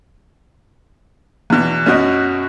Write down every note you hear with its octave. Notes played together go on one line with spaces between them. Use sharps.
E2 B2
F#2 B2 F#4 D#5